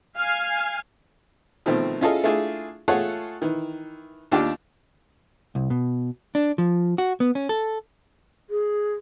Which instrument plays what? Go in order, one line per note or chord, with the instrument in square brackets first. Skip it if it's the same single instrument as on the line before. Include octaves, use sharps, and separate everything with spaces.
[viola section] F5 G#5
[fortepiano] B2 D#3 F3 A3 C4
C#4 E4 F4 G#4 A4 D#5
A3 D4 E4 F4 G#4
A3 F4 G#4 A4 C#5 F#5
D#3 E3
D#2 D4 F4 G4 D6
[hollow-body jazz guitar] C2
B2
D4
F3
F#4
B3
C#4
A4
[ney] G#4